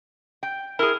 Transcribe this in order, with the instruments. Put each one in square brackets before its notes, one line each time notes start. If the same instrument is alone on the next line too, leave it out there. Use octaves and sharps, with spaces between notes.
[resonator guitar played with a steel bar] G5
[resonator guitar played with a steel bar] E4 G#4 [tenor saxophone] A#4